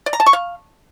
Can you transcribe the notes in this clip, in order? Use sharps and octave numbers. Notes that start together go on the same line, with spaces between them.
D5
A#5
A5
C#6
F5